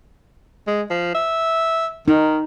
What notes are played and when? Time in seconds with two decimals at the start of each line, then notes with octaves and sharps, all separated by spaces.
0.67 G#3
0.90 F3
1.15 E5
2.08 D#3 D#4